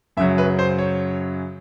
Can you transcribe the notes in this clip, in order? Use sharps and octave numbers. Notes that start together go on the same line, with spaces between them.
F#2 C#3 F#3 E5
B4
C5
C#5